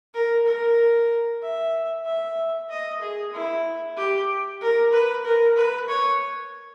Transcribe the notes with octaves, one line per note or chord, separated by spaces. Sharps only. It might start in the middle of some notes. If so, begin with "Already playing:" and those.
A#4
A#4
E5
E5
D#5
G#4
E4
G4
A#4
B4
A#4
B4
C#5